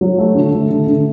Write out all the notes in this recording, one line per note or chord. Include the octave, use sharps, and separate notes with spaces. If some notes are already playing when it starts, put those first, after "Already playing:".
F#3
A3
D3
A3
D3
D3